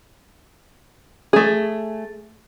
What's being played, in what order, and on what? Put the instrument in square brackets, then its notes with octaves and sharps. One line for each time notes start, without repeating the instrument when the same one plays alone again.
[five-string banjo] A3 G#4